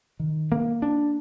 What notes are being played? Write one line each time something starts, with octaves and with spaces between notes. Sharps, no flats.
D#3
A#3
D4